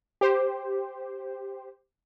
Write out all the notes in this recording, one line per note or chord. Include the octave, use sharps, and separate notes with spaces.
G4 C5